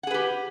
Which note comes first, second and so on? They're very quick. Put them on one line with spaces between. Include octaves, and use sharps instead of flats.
F#5 G#4 B4 G4